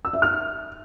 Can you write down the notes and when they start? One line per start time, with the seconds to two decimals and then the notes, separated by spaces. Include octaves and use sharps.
0.05 E6
0.13 E5
0.22 F6